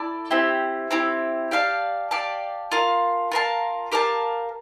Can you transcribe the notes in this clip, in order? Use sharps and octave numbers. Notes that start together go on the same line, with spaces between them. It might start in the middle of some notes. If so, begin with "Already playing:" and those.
Already playing: E4 A4 D5 A5
C4 E4 G4
C4 E4 G4
G4 D5 F5 A5
G4 D5 F5 A5
F4 A#4 F5 A5
F4 A#4 F5 A5
G4 A#4 F5 A5